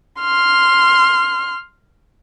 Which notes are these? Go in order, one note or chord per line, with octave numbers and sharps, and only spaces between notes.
C6 F6